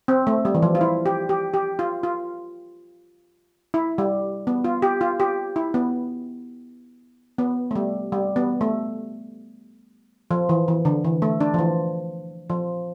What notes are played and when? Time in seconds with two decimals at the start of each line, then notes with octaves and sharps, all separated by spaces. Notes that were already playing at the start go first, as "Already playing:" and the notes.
0.08 C4
0.27 A3
0.45 G3
0.54 E3
0.63 F3
0.75 F4
0.81 E4
1.06 G4
1.29 G4
1.54 G4
1.79 F4
2.03 F4
3.74 E4
3.98 G3
4.47 B3
4.64 F4
4.82 G4
5.01 F4
5.20 G4
5.56 E4
5.74 B3
7.38 B3
7.71 A3
7.75 G3
8.12 G3
8.36 B3
8.61 A3
10.31 F3
10.49 E3
10.68 E3
10.85 D3
11.05 E3
11.22 A3
11.41 D4
11.54 F3
11.58 E3
12.50 F3